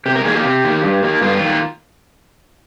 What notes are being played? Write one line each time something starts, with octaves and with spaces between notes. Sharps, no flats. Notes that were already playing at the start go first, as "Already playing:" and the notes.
C3 G4
A#4
D#3 A#3 G#4
G4
C3
D#3 A#3
G2
D#3 A#3
G2 F4
D#3 A#3